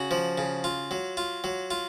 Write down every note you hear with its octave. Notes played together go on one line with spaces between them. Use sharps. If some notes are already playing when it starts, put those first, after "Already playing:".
Already playing: C#3 F#4
F3
C#3
F4
F#3
F4
F#3
F4